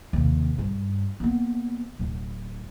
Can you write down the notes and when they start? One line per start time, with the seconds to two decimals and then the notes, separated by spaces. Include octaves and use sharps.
0.13 D#2 C3
0.58 G2
1.20 A#3 B3
1.99 D1